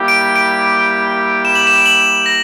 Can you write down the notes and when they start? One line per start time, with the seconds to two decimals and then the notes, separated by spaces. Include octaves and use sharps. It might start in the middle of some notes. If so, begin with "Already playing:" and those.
Already playing: G3 A#3 E4 G4
0.08 D7
0.36 D7
1.45 E7
1.55 F#7
1.67 E7
1.78 E7
1.86 F#7
2.26 A#6